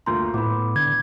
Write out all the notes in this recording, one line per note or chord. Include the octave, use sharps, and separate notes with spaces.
D2 A#2 A#5 C6 G6
A2 B3 E4 B5 D6
D3 G#6